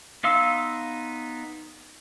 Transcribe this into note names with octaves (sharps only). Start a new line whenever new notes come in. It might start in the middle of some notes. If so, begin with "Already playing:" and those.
B3 D#4 F5 C6 E6